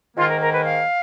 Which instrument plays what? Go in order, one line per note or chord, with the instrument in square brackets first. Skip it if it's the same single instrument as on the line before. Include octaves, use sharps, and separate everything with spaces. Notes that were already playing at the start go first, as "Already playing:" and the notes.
[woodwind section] G#2 D#3 A#3 F4
A#4
A#4
B4
F5